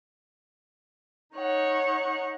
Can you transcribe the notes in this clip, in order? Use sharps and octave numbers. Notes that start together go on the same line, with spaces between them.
D#4 C#5 F#5